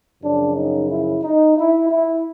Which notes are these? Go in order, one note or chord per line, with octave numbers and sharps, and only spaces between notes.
F#2 C#3 F3 D4
D#4
E4
D#4
E4
E4